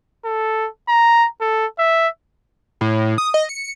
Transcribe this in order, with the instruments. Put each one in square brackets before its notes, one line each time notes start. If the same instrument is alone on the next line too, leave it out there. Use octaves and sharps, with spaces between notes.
[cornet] A4
A#5
A4
E5
[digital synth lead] A2
D#6
D#5
C#7